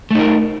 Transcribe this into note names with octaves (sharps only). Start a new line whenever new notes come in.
A3 D#4 A#4